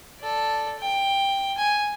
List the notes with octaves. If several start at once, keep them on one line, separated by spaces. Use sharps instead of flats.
A4 D5
G5
G#5